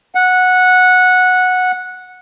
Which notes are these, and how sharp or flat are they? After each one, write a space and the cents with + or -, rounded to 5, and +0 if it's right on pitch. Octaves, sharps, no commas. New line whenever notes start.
F#5 -10